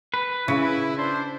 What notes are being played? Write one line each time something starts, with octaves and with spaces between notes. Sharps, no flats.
B4
C#3 E4
D4 C5